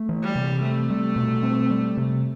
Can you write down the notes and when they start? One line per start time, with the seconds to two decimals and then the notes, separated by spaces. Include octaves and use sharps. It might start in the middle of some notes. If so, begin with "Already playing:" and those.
Already playing: A3
0.09 E3
0.22 G3
0.35 C3
0.62 A3 C4
0.90 G3
1.16 B2
1.43 C4
1.71 G3
1.97 C3